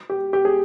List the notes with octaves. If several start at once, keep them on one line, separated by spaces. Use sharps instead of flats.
G4
G4
G#4